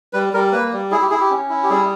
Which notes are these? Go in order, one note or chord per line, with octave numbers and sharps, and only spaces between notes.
G3 B4
G3 A#4
A#3 B4
G3
E4 G#4
G4
E4 G#4
G4
C#4
E4
G4
G3 G#4